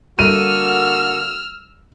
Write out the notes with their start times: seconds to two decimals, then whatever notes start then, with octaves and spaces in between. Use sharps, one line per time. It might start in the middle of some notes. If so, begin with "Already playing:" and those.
0.19 D3 G3 A#3 F#4 A4 E6 F6 D#7